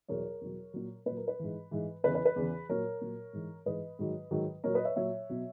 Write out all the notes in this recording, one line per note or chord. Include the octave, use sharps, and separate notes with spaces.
E2 B2 F#3 A#4 C#5
E2 B2 F#3
A#2 F#3
A#2 B4
F#3
A#4
B4
G#2 E3
G#2 E3
E2 C#3 E3 B4
B4
B4
E2 C#3 E3
A#2 F#3 A#4 C#5
A#2 F#3
G#2 E3
G#2 E3 B4 D#5
G#2 D#3 F#3
G#2 D#3 F#3
A#2 F#3 A#4 C#5
B4 D#5
C#5 E5
A#2 F#3 C#5 E5
B2 F#3